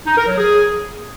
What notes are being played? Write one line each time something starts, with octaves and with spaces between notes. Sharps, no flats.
D#4
A#4
F#3
G#4